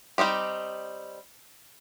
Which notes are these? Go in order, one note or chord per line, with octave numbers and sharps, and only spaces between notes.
G3 C4 D#4 G4